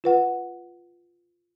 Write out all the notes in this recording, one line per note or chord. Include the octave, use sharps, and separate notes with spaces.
F4 B4 F#5